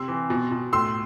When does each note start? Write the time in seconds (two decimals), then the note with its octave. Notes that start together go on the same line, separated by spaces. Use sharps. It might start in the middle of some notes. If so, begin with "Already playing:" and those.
Already playing: C3 C6 E6
0.08 E3
0.30 B2
0.51 B2
0.73 A2 C6 E6